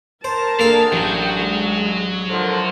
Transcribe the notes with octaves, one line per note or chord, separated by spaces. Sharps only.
A#4 C5 A5 A#5
D2 A#3 D4 G#4 A4 F5
A1 F#3 G5
G#3
A2 D3 F3 A4 A#4